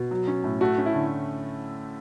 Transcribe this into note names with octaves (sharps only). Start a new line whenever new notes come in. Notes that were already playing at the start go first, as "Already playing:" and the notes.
Already playing: B2
F#3
C#4
A2
A3 F#4
C#4
E4
D3